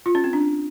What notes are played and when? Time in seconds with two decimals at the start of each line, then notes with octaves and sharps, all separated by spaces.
0.06 F4
0.15 C#4
0.24 C4
0.33 D4